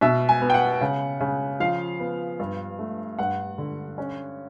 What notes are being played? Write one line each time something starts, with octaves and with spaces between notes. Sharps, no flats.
B2 E5
G#5
B3
G5
F#5
C#3
C#3
F3 F5
B3
G2
A3
G2 F#5
D3
C#4